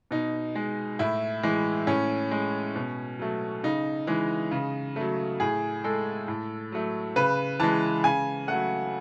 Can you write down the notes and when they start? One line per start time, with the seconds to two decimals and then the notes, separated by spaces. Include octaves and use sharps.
0.11 B2 D#4
0.55 G#3
0.99 A2 E4
1.43 E3 G#3
1.87 A2 C#4
2.31 G#3
2.76 B2
3.19 F#3 A3
3.63 C#3 D#4
4.07 E3 G#3
4.51 C#3
4.96 F#3 A3
5.40 A2 G#4
5.84 G#3 A4
6.28 A2
6.72 F#3 A3
7.16 C#3 B4
7.60 E3 G#3 A5
8.04 C#3 G#5
8.48 F#3 A3 F#5